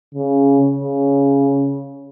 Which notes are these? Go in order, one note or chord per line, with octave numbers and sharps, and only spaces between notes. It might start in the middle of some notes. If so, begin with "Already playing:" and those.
C#3
C#3